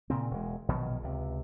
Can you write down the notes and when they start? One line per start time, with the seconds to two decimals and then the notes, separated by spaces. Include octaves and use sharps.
0.10 A#2 C#3 C4
0.31 E1 G#3
0.69 A#1 B2 D#3 F#3
1.03 C#2 C3